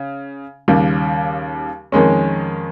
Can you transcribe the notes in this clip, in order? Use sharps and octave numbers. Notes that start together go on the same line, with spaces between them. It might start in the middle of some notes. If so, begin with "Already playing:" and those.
Already playing: C#3
D#2 C#3 G3
F2 D#3 G#3 C#4